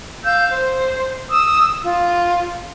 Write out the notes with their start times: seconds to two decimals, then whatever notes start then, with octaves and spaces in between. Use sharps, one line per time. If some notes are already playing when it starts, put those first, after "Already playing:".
0.24 F5 E6 G6
0.50 C5
1.30 D#6 E6
1.83 F4